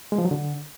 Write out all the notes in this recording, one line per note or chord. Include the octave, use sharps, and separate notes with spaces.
G#3
F3
F#3
D3